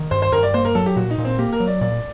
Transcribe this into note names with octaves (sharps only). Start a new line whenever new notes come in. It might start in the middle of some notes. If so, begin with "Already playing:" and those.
Already playing: D#3
G2 C5
C5
G2 A#4
D5
A#3 C5
A#4
F#3 A4
G4
A#2 F#4
D#4
A#2
C4
A#3 G4
A#4
F#3
D5
A#2 D5